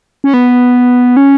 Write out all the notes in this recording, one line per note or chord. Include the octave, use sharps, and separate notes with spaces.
C#4
B3
C#4